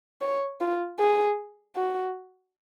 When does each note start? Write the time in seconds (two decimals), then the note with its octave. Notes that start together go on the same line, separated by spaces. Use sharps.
0.21 C#5
0.60 F4
0.99 G#4
1.76 F#4